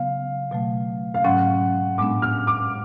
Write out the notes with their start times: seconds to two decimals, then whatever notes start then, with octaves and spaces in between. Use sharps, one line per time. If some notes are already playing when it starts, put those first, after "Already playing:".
Already playing: C#3 F#3 B3 F5
0.51 B2 F#3 A3
1.14 F5
1.24 G#2 F#3 C#4 F#5
1.98 A2 G#3 B3 D4 D6
2.22 F6
2.47 D6